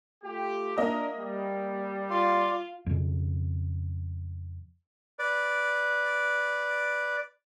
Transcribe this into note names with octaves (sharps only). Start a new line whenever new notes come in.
A3 F4 G4
A#3 D4 A#4 D#5 E5
G3
F4 D5 C6
F2 C#3
B4 D5